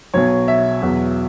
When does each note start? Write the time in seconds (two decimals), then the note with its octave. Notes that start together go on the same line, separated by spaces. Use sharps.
0.14 B1 B2 F#3 C#5
0.48 E5
0.82 E2 B2 F#3